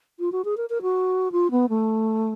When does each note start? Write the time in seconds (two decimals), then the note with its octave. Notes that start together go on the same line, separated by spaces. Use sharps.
0.19 F4
0.32 F#4
0.45 G#4
0.57 A#4
0.70 A#4
0.82 F#4
1.32 F4
1.51 B3
1.69 A3